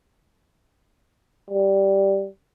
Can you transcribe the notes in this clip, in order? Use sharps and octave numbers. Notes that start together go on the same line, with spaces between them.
G3